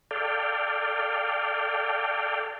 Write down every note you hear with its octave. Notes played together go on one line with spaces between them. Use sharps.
A4 D5 F5 G5